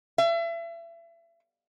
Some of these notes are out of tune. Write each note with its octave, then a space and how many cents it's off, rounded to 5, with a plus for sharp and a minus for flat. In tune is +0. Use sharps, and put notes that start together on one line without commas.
E5 +35